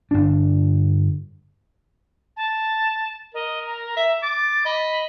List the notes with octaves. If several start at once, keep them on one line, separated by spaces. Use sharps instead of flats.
G1 D4
A5
A#4 D#5
A#5
E5
D6 A6
D#5 B5